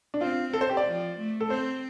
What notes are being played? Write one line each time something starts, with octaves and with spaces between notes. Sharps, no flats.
D4
C4 F4
A4
C5
G4
D5
F3
A3
A4
C4 C5